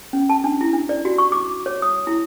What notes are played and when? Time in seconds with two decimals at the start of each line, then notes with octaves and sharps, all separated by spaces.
0.13 C#4
0.29 A5
0.44 D4
0.61 E4
0.73 D4
0.89 D5
1.05 F#4
1.18 C#6
1.32 D6
1.66 C#5
1.82 D#6
2.07 E4